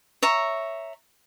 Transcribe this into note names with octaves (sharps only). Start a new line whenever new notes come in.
C#5 E5 A#5